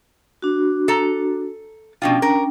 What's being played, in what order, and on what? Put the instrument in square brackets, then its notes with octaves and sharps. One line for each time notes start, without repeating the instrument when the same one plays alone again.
[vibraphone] D4 F#4
[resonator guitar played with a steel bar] A4 A#5
[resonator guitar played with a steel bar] B2 F3 F4 [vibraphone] C#4 D4 G5
[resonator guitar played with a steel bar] A#4